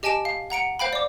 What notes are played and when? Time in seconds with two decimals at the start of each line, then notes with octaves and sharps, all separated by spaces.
0.03 G4 D#5 G#5 A5 D7 E7
0.25 F5
0.50 F#5 A#5 C#7 D7
0.79 C5 F5 G5 B5
0.93 D5 D6